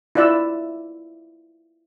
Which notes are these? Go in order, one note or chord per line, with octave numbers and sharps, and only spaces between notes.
E4 F4 D5 E5 E6